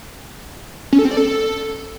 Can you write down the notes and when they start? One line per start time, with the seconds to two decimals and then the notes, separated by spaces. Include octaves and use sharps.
0.93 C#4
0.99 A4
1.05 C4
1.11 D5
1.17 A4